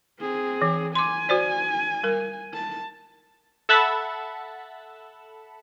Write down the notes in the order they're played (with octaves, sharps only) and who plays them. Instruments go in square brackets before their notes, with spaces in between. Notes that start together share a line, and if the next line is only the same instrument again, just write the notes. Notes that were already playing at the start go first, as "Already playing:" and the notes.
[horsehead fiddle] C4 G#4
[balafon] E3
[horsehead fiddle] G#5 [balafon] C6 D6
[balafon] F#4 C5 D5
G3 A#4
[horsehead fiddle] A5
[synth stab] A4 E5 F#5 A5 B5